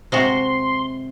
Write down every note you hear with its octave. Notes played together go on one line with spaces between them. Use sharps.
C3 G#3 F#4 C6